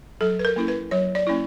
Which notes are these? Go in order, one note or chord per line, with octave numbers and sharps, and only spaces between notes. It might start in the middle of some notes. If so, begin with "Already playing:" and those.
F#3 A4
B4
A#4
A#3 C#4 E4
B4
F#3 C#5
D5
A#3 C#4 E4